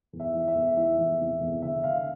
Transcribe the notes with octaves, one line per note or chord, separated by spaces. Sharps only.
E2
E5
E3
E5
E2
E3 E5
E2
C3
E2
D3 E5
D3 F5